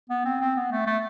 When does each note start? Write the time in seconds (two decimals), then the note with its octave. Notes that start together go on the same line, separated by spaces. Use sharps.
0.10 B3
0.25 C4
0.41 C4
0.56 B3
0.71 A3
0.87 A3